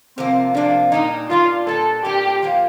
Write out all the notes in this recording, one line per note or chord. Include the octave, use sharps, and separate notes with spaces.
C3 F3 A#3 C4
C3 F3 A#3 D4
A#2 G3 D4 D#4
A#2 G3 D4 F4
A#2 G3 D4 A4
A#2 G3 D4 G4
A#2 F3 A#3 F4